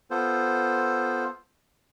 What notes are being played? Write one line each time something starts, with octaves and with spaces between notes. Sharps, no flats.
B3 F4 A4 C5